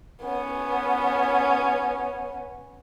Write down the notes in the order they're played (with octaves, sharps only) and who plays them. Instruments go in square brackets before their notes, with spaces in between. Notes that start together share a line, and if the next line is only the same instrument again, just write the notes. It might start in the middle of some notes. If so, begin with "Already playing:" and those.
[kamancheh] B3 C#4